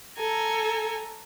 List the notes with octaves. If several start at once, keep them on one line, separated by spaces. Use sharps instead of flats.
A4 G#5 A#5